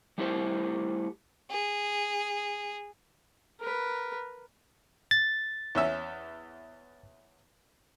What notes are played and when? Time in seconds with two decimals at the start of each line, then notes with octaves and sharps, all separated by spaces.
0.18 G3 A3 E4 G4 C5
1.50 G#4
3.60 A#4 B4
5.11 A6
5.75 E2 C#4 E5